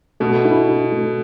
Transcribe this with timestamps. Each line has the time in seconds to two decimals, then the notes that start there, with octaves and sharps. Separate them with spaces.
0.20 B2 A3
0.45 E4
0.68 E4
0.92 A3